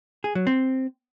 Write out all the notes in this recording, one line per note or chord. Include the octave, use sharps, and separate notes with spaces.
G#4
F#3
C4